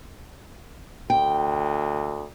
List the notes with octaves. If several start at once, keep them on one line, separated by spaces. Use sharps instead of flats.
D2 G5